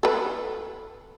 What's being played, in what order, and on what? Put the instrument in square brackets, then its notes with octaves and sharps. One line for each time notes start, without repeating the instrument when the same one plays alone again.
[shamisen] A4 B4